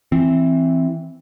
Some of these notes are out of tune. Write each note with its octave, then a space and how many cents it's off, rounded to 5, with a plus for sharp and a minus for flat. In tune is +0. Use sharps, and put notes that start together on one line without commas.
E3 +0 C4 +0